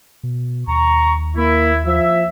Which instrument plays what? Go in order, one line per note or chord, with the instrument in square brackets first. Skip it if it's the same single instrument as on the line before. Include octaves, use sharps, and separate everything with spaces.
[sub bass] B2
[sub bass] D#2 [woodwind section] A#5 C#6
[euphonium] A#3 [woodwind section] E4
[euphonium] F3 [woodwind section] E5